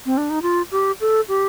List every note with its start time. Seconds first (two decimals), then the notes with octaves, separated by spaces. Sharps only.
0.06 C4
0.17 D4
0.30 D#4
0.42 F4
0.72 G4
1.01 A4
1.28 G4